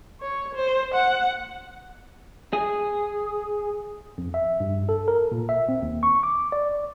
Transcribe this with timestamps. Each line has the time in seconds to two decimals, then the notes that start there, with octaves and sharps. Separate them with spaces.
0.21 C#5
0.55 C5
0.94 F#5
2.53 G#4
4.18 F2
4.34 E5
4.60 G2
4.89 A4
5.08 A#4
5.32 A#2
5.49 E5
5.69 C4
5.82 D#2
6.03 C#6
6.23 D6
6.52 D5